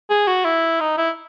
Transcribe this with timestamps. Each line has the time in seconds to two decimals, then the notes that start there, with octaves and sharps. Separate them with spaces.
0.10 G#4
0.27 F#4
0.45 E4
0.81 D#4
0.98 E4